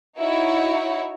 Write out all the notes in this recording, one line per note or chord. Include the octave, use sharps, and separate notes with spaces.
D#4 E4 F#4 C#5